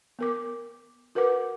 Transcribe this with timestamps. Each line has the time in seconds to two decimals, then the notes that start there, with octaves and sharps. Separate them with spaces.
0.19 B3 A#4 D6
1.15 F#4 A#4 B4 F#5 D6